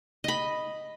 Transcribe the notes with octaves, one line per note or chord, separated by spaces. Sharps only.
D#5 B5